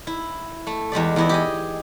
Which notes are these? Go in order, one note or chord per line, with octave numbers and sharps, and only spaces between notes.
E4
A3
E2 G#3 G4 D5
E2 E4 D#5
G4 G#4 D#5